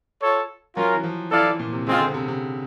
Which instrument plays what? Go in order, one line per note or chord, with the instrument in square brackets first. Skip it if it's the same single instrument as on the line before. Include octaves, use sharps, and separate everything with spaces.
[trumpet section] F4 A4 C#5
[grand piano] F#3 [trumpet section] C#4 F4 A#4
[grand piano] E3
F3
[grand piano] E3 [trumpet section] E4 A4 D5 F5
[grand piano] E3
A#2
C3
[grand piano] C#3 [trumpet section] G#3 C4 F4
[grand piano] D3
C3
C3